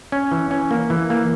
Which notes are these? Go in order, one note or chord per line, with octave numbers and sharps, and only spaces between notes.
C#4
E3
C#4
A#3
E3
A#3